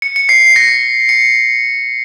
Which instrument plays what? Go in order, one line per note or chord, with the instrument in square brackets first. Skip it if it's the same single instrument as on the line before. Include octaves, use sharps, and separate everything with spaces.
[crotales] C#7
C#7
C7
A#6
C#7